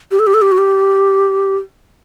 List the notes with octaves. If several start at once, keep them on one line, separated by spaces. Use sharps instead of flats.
G4
A4
G4
A4
G4
F#4
G4